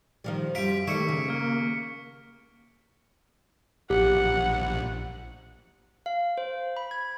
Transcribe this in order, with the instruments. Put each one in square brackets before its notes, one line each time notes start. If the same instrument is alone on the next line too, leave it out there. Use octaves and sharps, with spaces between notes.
[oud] D#3 F3 G3
[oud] F#2 [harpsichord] G3 F4 [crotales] B6 D7
[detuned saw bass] D#3 [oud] G3 A3 [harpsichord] E4 [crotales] C#6 C#7
[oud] C#3
[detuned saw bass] A#3 [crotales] F6 C#7
[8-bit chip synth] A#1 [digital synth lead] G4 [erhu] F#5
[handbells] F5
C5
B5
G#6